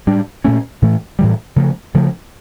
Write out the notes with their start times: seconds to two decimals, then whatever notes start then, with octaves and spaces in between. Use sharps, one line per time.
0.07 A2 G3 D4
0.45 A#2 A3 C#4
0.82 A2 E3 A3
1.19 A2 E3 G3
1.56 C#3 F3 A3
1.94 C#3 F3 A3